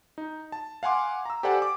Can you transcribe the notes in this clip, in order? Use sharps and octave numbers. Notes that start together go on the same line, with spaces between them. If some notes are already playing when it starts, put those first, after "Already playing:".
D#4
A5
F5 F#5 G#5 C6 D6
A#5 E6
G4 A4 C5 D5 F#5 G#5
D6